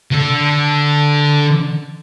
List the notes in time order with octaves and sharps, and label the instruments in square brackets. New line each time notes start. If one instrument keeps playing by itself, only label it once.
[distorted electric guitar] D3 A4